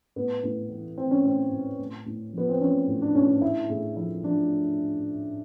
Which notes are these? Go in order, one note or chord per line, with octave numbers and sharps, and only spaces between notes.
A2 B3
A2
E3
E3 C4
C#4
A2 C4
A2
A2
A2
F3 B3
C4
F3 C#4
A2
D4
A2 C#4
D4
A2 E4
A2 G#4
F3 E4
F3 D4